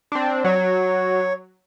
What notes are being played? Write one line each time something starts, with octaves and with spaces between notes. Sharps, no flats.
C4 D4
F#3 C#5